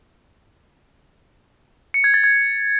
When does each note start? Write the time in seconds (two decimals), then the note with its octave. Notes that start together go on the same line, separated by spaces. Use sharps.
1.94 C#7
2.04 G#6
2.14 A6
2.24 G#6